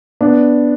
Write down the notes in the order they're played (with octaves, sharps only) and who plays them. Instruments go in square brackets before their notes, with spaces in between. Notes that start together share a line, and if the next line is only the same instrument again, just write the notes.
[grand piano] B3 D4